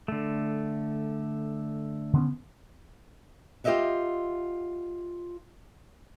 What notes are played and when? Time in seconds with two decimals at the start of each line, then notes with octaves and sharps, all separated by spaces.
0.08 D3 A3
2.14 D3 B3 C#4
3.64 F4 G4 C5 D#5 E5 F#5